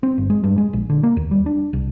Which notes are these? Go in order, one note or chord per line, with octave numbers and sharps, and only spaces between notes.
C4
G1
G#3
G2
G#3
A#1
D3
A#3
D#2
G3
D4
C2